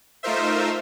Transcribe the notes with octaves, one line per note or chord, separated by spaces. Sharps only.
A3 D#4 F4 A#4 C5 E5